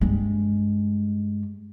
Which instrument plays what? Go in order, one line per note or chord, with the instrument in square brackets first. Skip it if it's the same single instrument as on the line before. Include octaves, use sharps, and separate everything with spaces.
[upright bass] G2 G#3